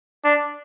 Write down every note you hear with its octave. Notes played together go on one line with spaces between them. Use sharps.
D4